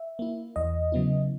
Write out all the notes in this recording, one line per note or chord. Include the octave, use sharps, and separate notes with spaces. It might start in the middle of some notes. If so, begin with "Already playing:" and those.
Already playing: E5
A#3 E4
E2 D#5
C#3 F#3 B3 E4